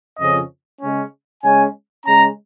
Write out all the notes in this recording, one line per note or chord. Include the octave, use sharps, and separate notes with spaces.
F2 C#3 F3 C#4 D#5
C#3 G#3 C#4
C#3 G#3 C#4 G#5
C#3 G#3 C#4 A#5